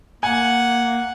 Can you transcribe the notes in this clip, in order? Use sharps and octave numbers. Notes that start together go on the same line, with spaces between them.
A#3 F#5 G#5